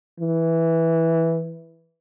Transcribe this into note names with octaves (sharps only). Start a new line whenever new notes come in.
E3